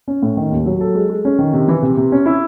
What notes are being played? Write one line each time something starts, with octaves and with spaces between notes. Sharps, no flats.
C#4
A2
D#3
D#2
F#3
A4
G#3
G#3
C#4
D#3
C3
E3
C3
C3
C#4
E4